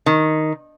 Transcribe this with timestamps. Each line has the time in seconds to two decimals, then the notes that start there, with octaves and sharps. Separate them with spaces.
0.06 D#3